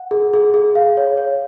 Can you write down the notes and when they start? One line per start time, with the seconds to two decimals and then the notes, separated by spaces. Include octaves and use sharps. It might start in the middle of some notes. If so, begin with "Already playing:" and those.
Already playing: F#5
0.11 G#4
0.33 G#4
0.54 G#4
0.75 G#4 F5
0.97 C#5
1.17 C#5